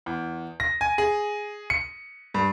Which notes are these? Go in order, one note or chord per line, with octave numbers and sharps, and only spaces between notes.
E2
A#6
G#5
G#4
C#7
G2